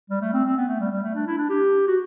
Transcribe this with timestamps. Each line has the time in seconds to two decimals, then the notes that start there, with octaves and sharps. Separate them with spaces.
0.10 G3
0.22 A3
0.34 C4
0.45 C4
0.57 B3
0.68 A3
0.80 G3
0.92 G3
1.03 A3
1.15 D4
1.27 E4
1.38 D4
1.50 G4
1.88 F#4